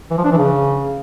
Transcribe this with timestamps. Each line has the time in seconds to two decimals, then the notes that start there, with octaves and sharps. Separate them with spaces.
0.11 E3
0.18 F3
0.24 D4
0.31 E3
0.38 C#3